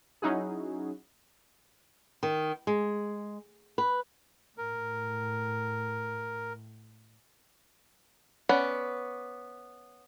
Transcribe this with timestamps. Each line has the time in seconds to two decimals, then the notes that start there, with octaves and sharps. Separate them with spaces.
0.22 F#3 C#4 D#4 E4 F#4 G#4
2.23 D#3
2.67 G#3
3.78 B4
4.58 A2 A#4
8.49 B3 C#4 D5